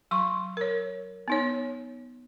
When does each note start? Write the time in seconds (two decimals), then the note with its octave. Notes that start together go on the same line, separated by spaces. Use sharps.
0.11 F#3 C6 C#6
0.57 A#4 C#5
1.28 B3 D#4 C#5